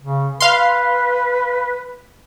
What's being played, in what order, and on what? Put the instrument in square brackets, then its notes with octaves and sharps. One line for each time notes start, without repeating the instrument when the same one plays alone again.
[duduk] C#3
[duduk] B4 [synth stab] F5 C6